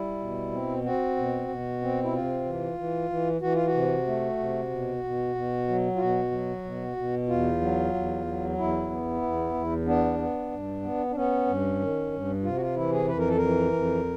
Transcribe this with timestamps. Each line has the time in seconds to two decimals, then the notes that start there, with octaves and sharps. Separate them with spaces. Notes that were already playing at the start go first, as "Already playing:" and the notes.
Already playing: G3 E4
0.19 B2
0.51 C4
0.84 C4 F#4
1.17 B2
1.48 B2
1.81 C4
2.04 E4
2.13 C3 F4
2.45 E3
2.78 E3
3.10 E3
3.41 E3 F#4
3.54 F4
3.66 F#4
3.74 C3
4.07 A3
4.38 C3
4.70 B2
5.04 B2
5.35 B2
5.68 F#3
5.96 F4
5.99 B2 F#4
6.31 F#3
6.65 B2
6.96 B2
7.29 E2 F4
7.61 F#3
7.93 E2
8.26 F#3
8.58 E2 E4
8.90 B3
9.22 E2
9.54 E2
9.86 B3 D4
10.19 B3
10.51 G2
10.82 B3
11.11 D4
11.15 B3 C#4
11.47 G2
11.80 D#3
12.12 G2
12.43 C3 F4
12.56 F#4
12.61 F4
12.76 E3 E4
12.92 G#4
13.08 F2 B4
13.19 A#4
13.28 A4
13.37 E3 A#4
13.73 F2